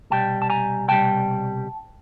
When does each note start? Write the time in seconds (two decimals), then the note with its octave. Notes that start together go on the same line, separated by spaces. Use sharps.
0.10 C2 B2 G3 G5 A5
0.42 A5
0.50 G#5 A#5
0.88 C2 B2 G3 G5 A5